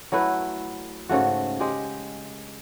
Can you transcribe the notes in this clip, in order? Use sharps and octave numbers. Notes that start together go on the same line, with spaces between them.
F#3 A3 E4 B4
G#2 C#3 A3 F#4
G#3 G4